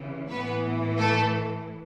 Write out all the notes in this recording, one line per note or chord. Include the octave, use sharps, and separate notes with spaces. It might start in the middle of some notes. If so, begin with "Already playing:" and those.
Already playing: C#3 E3
A2 E3 B3 B4
A3 A4